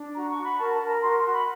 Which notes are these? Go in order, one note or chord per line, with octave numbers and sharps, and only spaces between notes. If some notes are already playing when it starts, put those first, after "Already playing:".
Already playing: D4
F#4 A#5
C#6
F#4
B5
A#4 A5
A5
A#4
A#5
F#4 C6
C6
F#4
B5